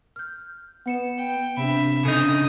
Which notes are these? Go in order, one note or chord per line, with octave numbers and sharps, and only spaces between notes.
F6 G6
B3 F#5 C#7 E7
G5
C3 D4 E5 B5
C#3 D4 D#4 A4 D#6